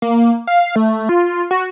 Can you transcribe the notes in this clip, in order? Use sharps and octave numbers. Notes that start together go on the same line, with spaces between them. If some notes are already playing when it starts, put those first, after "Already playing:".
A#3
F5
A3
F4
F#4